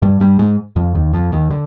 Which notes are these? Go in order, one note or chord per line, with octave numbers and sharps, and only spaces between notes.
G2 G3
G2 G3
G#2 G#3
F2 F3
D#2 D#3
F2 F3
D#2 D#3
D3